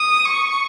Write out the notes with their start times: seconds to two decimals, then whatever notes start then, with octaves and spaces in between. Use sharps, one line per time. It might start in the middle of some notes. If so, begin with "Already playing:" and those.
Already playing: D#6
0.25 C#6